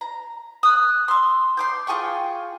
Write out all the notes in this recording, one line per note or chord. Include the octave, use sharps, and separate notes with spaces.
A#5
D#6 F#6
C6 E6
C6 D6 G6
F4 G#4 G5 C#6